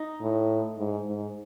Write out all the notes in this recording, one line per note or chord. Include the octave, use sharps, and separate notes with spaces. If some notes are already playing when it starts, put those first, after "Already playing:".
Already playing: D#4
A2
G#2
G#2